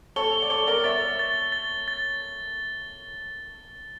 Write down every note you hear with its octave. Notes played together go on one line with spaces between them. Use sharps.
A4 C#5 G7
D5
A4 C#5 G7
A#4 D5
C#5 E5 A6
A6
A6
A6